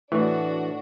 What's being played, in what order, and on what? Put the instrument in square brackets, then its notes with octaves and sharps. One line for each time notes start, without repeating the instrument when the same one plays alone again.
[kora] A2 [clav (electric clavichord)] E3 [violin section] D4 F#4